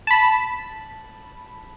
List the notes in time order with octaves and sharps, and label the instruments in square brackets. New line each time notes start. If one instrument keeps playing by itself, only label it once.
[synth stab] A5 B5